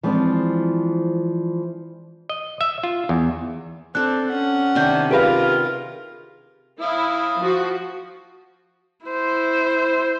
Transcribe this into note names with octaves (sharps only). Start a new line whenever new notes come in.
E3 F3 G#3 C4 D4
D#5
E5
F4
E2
C4 D4 A4 F#6
C#4 F#5
C3 D#3 D4 D5 G6
F4 G4 G#4 A#4 B4 E5 F5 B5
E4 F5 D#6
F3 F#4
E4 C5